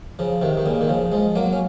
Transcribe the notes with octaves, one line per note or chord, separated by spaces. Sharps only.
C#3 F3
C3 D#3
D#3
A#2 C#3
D#3
C#3 F3
F3 G#3
F#3 A#3
C#4